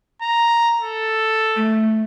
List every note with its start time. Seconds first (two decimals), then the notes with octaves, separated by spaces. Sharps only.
0.22 A#5
0.81 A4
1.56 A3